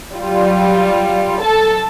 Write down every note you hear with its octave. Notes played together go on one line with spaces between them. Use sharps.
F#3 G3 F4
A4 A5